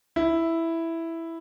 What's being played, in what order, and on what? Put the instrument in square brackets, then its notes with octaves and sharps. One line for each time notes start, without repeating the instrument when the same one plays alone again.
[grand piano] E4